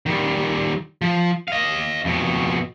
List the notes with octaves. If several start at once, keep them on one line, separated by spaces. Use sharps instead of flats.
D#3 G3
F3
D#5 F5
F2 B2